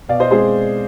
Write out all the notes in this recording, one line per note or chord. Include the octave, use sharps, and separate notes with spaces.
B2 D5 F5
C5 D#5
G#3 C4 G#4 C5